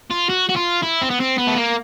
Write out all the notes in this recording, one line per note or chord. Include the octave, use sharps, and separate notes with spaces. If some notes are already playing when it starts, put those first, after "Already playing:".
F4
F#4
F#4
F4
E4
C4
B3
C4
B3
A3
A#3